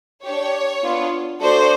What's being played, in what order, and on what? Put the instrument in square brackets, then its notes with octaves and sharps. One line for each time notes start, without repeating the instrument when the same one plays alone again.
[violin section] D4 G4 C#5
B3 D4 F4
A3 D4 F#4 A4 C5 D5